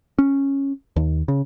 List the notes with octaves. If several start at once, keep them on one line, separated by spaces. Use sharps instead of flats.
C#4
D#2
C#3